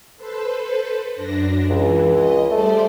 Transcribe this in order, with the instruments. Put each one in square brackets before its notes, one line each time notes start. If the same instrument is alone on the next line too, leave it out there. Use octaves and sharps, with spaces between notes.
[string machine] A4 B4 C5
F#2 D4 A#6
[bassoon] C#2 [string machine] E3
[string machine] D#5
[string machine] G3 C5 D5 [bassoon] A3